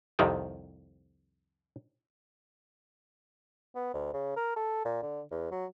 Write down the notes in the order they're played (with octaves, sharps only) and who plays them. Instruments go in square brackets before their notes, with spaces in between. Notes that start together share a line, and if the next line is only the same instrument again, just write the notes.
[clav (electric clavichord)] C2 F2 C3 D#3 G5
[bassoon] B3
D2
C#3
A#4
A4
A#2
D3
E2
F#3